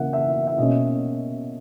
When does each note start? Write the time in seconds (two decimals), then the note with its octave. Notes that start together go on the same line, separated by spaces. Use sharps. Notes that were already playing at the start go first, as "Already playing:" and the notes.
Already playing: C#3 E3 A#3 E5 F#5
0.13 E5
0.47 E5
0.58 B2 A#3 C#4 D#5